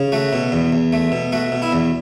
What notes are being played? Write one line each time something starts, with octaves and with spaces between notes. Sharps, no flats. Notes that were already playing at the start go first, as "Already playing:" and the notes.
Already playing: C#3
A3 F#4
B2
E2
E2
A3
B2
A3 F#4
B2
E4
E2